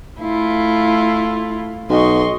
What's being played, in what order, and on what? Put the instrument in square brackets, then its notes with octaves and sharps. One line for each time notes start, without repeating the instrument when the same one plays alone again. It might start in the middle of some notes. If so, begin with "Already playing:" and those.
[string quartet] A3 E4 F4
[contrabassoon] B1 [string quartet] D#5 C6 C#6